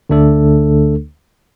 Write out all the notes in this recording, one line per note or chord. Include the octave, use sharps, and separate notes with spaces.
D2 D3 A3 D4 A4